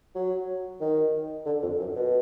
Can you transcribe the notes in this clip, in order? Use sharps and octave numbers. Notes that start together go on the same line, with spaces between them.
F#3
D#3
D3
F2
F#2
B2